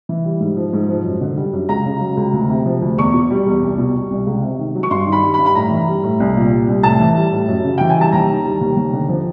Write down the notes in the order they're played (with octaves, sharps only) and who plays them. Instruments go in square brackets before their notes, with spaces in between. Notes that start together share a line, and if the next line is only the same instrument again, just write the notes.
[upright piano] E3
G3
G#2
F3
G#2
F3
F#2
D3
G3
F#2
C#2 A#5
C#3
F#3
C#2
D2
C3
F3
D2
E2 C#6
B2
G3
E2
C2
B2
G3
C2
C#2
C3
D#3
F#3
C#6
G2 C6
D#3
B5
G3
B5
G2
B5
A2 A#5
E3
G3
A2
C2
A#2
G3
C2
A2 A5
E3
G3
A2
F#2
C#3
E3 G5
G#5
G3 A5
D#2 A#5
D#3
G3
D#2
D#2
D3
F3